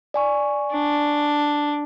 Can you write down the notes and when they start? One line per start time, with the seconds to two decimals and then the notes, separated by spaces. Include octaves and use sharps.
0.14 D5 G#5 C#6
0.72 D4